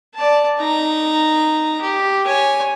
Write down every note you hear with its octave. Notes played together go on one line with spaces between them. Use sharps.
D5 A5
D#4 A#5
G4
C#5 G#5